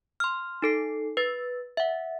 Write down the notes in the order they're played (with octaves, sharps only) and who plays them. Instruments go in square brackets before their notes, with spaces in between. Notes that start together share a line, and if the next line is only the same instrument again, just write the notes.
[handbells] C6 F6
D#4 A4 C7
B4 A6
E5 F#5